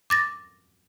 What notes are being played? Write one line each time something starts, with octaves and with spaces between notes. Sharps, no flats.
D6 A6 A#6